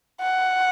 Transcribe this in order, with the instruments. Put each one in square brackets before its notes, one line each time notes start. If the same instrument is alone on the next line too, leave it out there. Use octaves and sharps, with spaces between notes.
[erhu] F#5